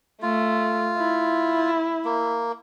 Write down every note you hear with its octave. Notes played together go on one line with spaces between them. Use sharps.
A3 F4
E4
A#3